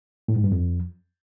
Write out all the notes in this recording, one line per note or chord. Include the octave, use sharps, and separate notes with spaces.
A2
G#2
G2
F2